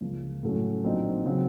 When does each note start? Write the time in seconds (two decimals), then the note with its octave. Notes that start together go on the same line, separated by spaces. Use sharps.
0.01 C#2 C#3 F3 A#3
0.43 A2 F#3 A3 C#4
0.84 A#1 A#2 F#3 C4 D#4
1.25 C#3 F#3 C4